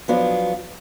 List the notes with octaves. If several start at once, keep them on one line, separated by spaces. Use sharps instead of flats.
F3 F#3 B3 D4